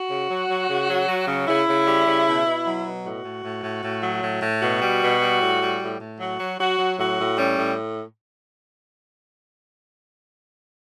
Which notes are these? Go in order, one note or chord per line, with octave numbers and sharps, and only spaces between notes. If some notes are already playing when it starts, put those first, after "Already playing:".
Already playing: F#4
C#3
F#3
F#3
C#3
F#3
F#3
C#3
C#3 E4
C#3
G3
C#3
B2
B2
F#3
B2
A2 F#4
A2
A2
A2
A2
F#3
A2
A2
B2 F#4
G3
B2
G3
A2
G3
A2
A2
F#3 F#4
F#3
F#3 F#4
F#3
A2 F#4
A2
G3 C#4
A2